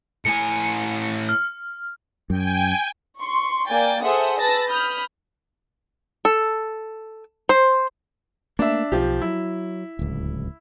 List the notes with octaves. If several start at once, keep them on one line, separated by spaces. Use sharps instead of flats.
A2 G#5 C#7
F6
F#2 G5 G#5
C6 C#6
A#3 D5 G5 G#5 A6
G#4 A4 C5 E5 F#5 D#6
B4 A5 E6 A6 A#6
B5 D#6 F6 G6
A4
C5
A3 A#3 D4 E5
B1 F3 G4
F#3 E4
D1 C#2